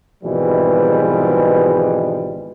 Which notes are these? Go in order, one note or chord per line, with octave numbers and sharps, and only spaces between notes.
G#1 B2 E3 F3 G3 G#3